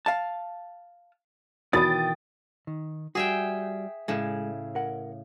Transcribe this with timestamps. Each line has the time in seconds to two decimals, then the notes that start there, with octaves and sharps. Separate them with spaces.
0.06 F5 A5
1.73 B2 D#3 E3 F#4 G5 B5 D#6 A6
2.67 D#3
3.15 G3 F#4 G#4 E5 G5
4.08 A2 C#3 G#3
4.75 A#4 F#5